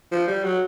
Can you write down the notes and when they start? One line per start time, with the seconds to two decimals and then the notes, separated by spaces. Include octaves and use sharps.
0.12 F3
0.28 G3
0.44 F#3